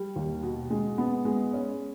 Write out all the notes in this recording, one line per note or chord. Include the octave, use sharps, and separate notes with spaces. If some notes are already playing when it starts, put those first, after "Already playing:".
Already playing: G3
D#2
B2
G#3
B3
G#3
C#4